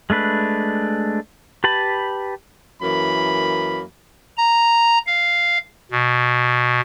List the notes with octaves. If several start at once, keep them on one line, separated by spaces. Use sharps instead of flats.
G#3 A3 D4 B4
G4 B4 A5 B5
F#2 E3 A#3 B5
A#5
F5
B2